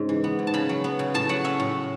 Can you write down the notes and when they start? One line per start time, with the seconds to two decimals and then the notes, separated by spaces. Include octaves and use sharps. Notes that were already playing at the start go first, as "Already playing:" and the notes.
Already playing: G#2 C#3 G#3
0.09 E3
0.24 B3
0.39 G#2
0.47 A5
0.54 C#3 B5
0.69 F#3
0.84 B3
0.99 C#3
1.14 A2 A5
1.29 F#3 F#5
1.44 C#4 E5
1.60 A2